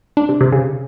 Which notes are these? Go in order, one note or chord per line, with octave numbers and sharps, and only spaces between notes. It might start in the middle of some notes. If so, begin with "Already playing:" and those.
D4
C3
C3
C#3